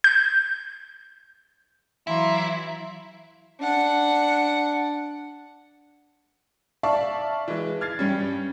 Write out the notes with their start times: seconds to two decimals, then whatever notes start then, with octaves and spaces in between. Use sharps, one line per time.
0.04 G6
2.07 E3 F#3 E4 F5 A#5 C6
3.60 D4 F#5
6.83 D5 E5 F5 A5 C#6
7.48 E3 G#3
7.81 F6 G#6 A6 C7
7.99 G2 G3 C#4